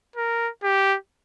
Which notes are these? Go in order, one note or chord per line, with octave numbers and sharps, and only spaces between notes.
A#4
G4